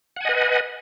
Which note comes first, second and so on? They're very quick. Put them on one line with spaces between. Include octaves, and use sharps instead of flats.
F#5 G#5 D#5 B4